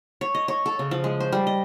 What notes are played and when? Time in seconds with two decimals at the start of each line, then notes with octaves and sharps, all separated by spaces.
0.21 C#5
0.35 D#5
0.48 C#5
0.66 A4
0.79 C#3
0.91 F3
1.04 G#3
1.20 C5
1.32 G3
1.47 D#5